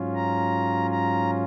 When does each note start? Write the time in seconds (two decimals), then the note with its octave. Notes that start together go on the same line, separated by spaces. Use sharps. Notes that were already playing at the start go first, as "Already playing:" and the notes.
Already playing: G#2 F#3 C#4 F4
0.15 A#5
0.91 A#5